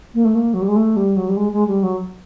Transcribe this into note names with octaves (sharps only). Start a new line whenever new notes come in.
A#3
A3
A#3
F#3
G3
G#3
A3
G3
F#3
G3
G#3
G#3
G3
F#3